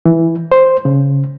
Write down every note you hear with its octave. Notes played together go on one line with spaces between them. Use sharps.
E3
C5
C#3